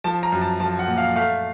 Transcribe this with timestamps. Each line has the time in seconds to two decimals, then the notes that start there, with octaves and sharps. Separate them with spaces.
0.04 F3 A5
0.23 A#5
0.32 F#2
0.42 A5
0.60 F3 A5
0.79 F#5
0.88 A#2
0.98 F5
1.16 A3 F5